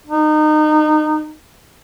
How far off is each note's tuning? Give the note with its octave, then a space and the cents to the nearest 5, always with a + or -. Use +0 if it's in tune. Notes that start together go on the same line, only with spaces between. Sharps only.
D#4 -25